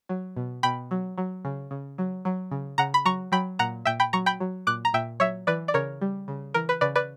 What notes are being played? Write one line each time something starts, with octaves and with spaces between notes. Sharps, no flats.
F#3
B2
B2 G5 B5
F#3
F#3
C#3
C#3
F#3
F#3
C#3
C#3 F#5 A#5
B5
F#3 A#5 C#6
F#3 G5 B5
A#2 F#5 A#5
A#2 E5 G5
G5 B5
F#3 A#5 C#6
G5 B5
F#3
A#2 D6 F#6
A#5
A#2 E5 G5
F#3 C#5 E5
E3 B4 D5
D5
C#3 A#4 C#5
G3
C#3
E3 A#4
B4
C#3 B4 D5
B4 D5